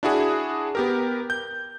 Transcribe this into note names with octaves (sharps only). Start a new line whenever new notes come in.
D4 E4 F#4 G#4
B3 G4 A#4
G6